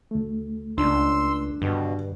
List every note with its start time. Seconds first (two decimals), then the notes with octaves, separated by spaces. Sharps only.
0.11 D2 A3
0.78 C#2 D4 C6 E6
1.62 G2 B2 D3